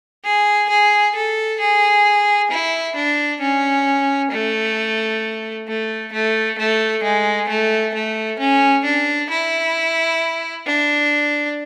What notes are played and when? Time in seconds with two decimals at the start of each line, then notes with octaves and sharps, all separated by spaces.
0.24 G#4
0.69 G#4
1.15 A4
1.60 G#4
2.51 E4
2.96 D4
3.41 C#4
4.31 A3
5.68 A3
6.13 A3
6.58 A3
7.03 G#3
7.49 A3
7.94 A3
8.39 C#4
8.84 D4
9.30 E4
10.66 D4